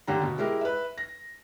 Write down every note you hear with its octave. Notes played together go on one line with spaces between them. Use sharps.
D#2 D3 G4 A#5
B2
G#3 E4 G4 A#4
B4 E5
A#6